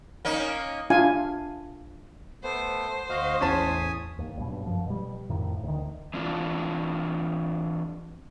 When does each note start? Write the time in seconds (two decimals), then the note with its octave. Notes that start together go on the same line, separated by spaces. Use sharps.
0.25 A#3 C#4 D#4
0.90 D4 F4 E5 F5 G#5
2.44 A3 B3 C5
3.10 D2 F#4 D#5 F5
3.41 A1 E2 C#4 G#5 A5 D#6 B6
4.19 D#2
4.37 B1 G2 B2
4.64 F#2 F3
4.86 B2 G3
5.30 F2 A2 D#3
5.63 D2 D#3
6.13 E3 C4 D4 F4